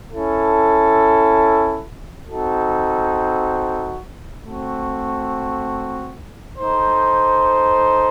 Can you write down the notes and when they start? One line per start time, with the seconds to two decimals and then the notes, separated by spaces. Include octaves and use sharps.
0.10 C#4 E4 A4
2.26 C4 D#4 F#4 A4
4.43 A3 C4 F#4
6.59 D#4 A4 C5